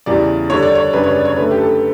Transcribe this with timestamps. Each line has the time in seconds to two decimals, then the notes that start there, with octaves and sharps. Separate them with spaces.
0.06 E2 C#3 G3 D5
0.50 D3 G3 D4 C#5
0.62 D5
0.75 C#5
0.93 F#2 C#3 G3 D4 B4
1.04 C#5
1.15 D5
1.25 C#5
1.36 F#2 D3 A3 C#4 B4
1.51 G4
1.58 A4